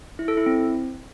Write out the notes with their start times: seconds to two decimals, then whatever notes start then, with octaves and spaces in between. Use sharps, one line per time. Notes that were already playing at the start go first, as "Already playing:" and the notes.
0.19 E4
0.28 A4
0.37 E4
0.46 C4